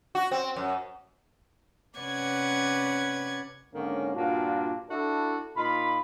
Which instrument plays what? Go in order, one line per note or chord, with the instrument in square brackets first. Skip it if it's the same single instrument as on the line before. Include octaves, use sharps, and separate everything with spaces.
[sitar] F#4
C4
F#2
[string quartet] C3 C#4 B4 D5 F#5 G#6
[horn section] G#2 D3 D#3 A#3 C#4
G2 A#2 A#3 D4 F4 F#4
D4 E4 F#4 A4
A#2 D#4 F4 B5